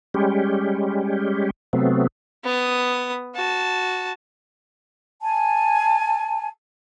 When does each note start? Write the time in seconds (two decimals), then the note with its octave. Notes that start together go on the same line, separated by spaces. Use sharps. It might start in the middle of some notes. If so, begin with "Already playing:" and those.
0.14 G3 G#3 C#4 G4
1.73 C3 F#3 A3 B3 C4
2.44 B3 D#6
3.35 F#4 A5
5.20 G#5 A5